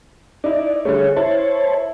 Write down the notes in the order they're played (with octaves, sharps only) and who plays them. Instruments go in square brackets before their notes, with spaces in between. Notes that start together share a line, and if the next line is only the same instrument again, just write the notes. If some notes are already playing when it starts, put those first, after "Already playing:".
[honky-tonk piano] D#4 E4 [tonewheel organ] D5
[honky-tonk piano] D3 G3 A3 [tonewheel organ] G#4 C#5
[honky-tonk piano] E4 [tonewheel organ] C5 C#5 A5